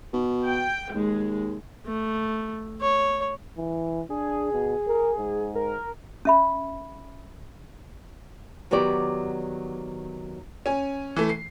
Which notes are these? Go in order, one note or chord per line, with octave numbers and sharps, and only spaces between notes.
B2
G5
D#2 G#3
A3
C#5
E3
D4 G#4
B2
A#4
G#2
A#4
C#4 E5 B5
D#3 F#3 B3 G4 D5
C#4 G#5
E3 A3
C7